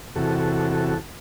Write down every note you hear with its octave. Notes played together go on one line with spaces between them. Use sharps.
E2 C3 F#4 A4